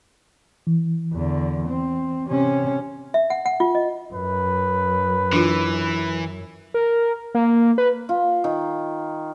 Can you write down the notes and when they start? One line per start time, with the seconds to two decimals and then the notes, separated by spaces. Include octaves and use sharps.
0.67 E3
1.13 E2 D3
1.68 C4
2.26 C3 C#4
3.14 E5
3.30 F#5
3.46 F#5
3.60 F4
3.75 D#5
4.14 F#2 B4
5.33 E3 D4 F4
6.74 A#4
7.35 A#3
7.78 B4
8.09 F4
8.44 D#3